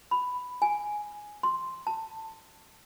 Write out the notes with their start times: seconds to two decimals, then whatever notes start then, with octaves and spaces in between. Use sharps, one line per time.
0.11 B5
0.62 G#5
1.43 C6
1.87 A5